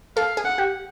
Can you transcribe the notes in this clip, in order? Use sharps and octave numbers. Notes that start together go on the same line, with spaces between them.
A4 F5
G#4
F#5
G4